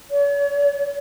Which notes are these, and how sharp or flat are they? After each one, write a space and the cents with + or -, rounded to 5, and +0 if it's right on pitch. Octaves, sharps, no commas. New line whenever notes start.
C#5 +45